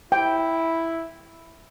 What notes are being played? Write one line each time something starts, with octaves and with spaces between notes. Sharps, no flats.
E4 G5